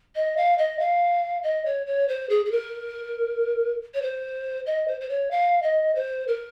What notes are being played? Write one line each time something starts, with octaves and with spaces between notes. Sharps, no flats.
D#5
F5
D#5
F5
D#5
C#5
C#5
C5
G#4
G#4
A#4
C#5
C5
D#5
C5
C5
C#5
F5
D#5
C5
A#4